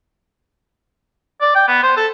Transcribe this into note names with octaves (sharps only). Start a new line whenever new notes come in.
D5
G5
B3
C5
A4